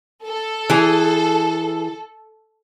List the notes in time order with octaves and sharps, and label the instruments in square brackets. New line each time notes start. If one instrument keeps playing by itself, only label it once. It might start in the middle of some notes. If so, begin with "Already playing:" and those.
[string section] A4
[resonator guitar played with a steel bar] E3 G#4